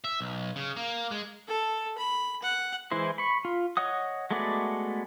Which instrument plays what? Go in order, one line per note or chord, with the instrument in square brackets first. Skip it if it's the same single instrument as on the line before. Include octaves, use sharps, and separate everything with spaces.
[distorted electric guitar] E5
B1
C#3
A#3
G#3
[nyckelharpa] A4
B5
F#5
[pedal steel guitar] E3 G#3 E4 C5
B5 C#6
F4
C#5 D#5 F#5 D#6
G#3 A3 B3 F#4 D5